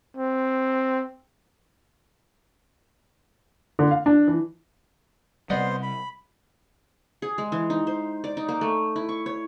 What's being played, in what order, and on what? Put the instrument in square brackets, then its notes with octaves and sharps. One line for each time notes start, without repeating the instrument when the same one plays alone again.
[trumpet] C4
[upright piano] D3
F5
D4
E3
[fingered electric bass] C3 G3 [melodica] B3 C5 C6 [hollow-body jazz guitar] D5 D#5 F#5
[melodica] B5
[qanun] G#4
G#3
E3
D#4
C5
D5
D#4
A#3
A3
E4
C#6
C#5